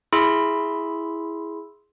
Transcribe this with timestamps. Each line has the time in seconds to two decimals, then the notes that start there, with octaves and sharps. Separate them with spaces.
0.13 E4 G#4 B5 C6 E6